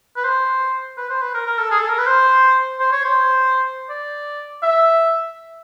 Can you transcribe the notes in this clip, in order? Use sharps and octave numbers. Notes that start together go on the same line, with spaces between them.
B4
C5
B4
C5
B4
A#4
A#4
A4
G#4
A4
A#4
B4
C5
C5
C#5
C5
D5
E5